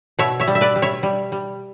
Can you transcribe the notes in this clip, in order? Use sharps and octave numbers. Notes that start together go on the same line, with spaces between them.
B2 C#5 E5
C#5 E5
G3
E5
B4 D5
G3
C#5 E5
G3
G3